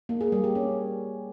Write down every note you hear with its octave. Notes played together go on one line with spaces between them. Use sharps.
A#3
G#4
G3
G4
C#4